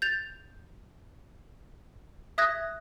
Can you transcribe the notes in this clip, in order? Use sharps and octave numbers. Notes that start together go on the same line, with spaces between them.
G6 A6 F7
E5 D#6 F#6 G#6 A#6